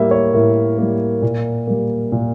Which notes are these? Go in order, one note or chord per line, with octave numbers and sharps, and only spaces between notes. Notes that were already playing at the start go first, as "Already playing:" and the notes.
Already playing: A2 G3 A#3 E5
C#5
A2 A#4
G3 A#3
A#2
G3 A#3
A#2